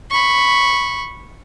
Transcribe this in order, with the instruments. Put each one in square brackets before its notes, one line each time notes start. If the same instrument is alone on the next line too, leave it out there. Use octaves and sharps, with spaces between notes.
[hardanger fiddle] B5 C#6